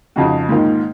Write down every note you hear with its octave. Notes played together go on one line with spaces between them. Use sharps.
F2 C#3 G#3 D#4 F#4
G#2 D#3 A#3 F4